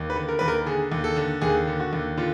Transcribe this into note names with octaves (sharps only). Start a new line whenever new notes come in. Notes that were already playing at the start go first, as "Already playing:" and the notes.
Already playing: D#2
B4
D3
A#4
D#2 B4
A#4
D3 G#4
D#2
A4
D3
D#2 G#4
D3
F#4
D#2
D3 F4